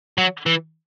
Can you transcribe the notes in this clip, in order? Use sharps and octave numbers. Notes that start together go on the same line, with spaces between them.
F#3
E3